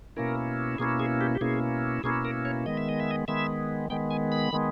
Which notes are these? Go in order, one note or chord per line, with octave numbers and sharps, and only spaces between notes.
B2 A#3 C#4 E4 A#4
B2 A#3 C#4 E4 G#4
G#4
G4
G4
B2 A#3 C#4 E4 G#4
B2 A#3 C#4 E4 G#4
A#4
C#5
D#3 G#3 B3 D#5
E5
D#5
E5
D#5
D#3 G#3 B3 E5
D#3 G#3 B3 G5
G#5
B5
D#3 G#3 B3